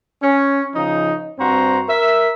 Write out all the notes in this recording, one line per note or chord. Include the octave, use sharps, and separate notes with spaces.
C#4
C#3 F3 D#4
G2 C4 F#4 C5 A#5
A#4 E5